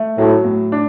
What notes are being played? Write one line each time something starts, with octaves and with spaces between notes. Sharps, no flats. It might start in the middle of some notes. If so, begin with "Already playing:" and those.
Already playing: A3
A2 F#3
A2
D4